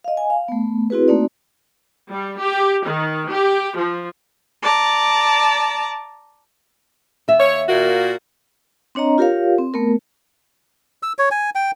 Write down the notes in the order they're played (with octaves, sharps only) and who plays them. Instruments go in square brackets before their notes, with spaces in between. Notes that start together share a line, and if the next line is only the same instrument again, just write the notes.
[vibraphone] D#5 F5
G#5
F5
A3 B3
C4 E4 F#4 G#4 B4
A3 A#3 C4 D#4 F#4 D5
[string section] G3
G4
D#3
G4
F3
[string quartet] D5 A5 A#5
[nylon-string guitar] D#2 E5
[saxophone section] C#5
A#2 A#3 F#4
[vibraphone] C4 D4 C#5 D#5 A#5
F4 G4 A#4 C#5 F5
C4
A3 B3 A#4
[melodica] E6
C#5
G#5
G5